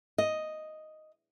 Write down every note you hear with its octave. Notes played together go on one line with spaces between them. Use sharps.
D#5